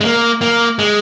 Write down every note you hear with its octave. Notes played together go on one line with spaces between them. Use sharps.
G#3
A#3
A#3
G#3